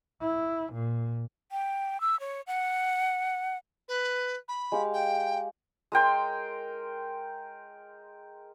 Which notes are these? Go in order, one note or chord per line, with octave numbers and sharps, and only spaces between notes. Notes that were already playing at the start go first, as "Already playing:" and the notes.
E4
A#2
G5
E6
C#5
F#5
B4
B5
G#3 G4 F5
G5
G#3 A#4 G5 C6